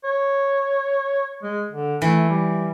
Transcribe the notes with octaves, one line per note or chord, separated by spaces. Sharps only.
C#5
G#3
D3
E3 A3
G3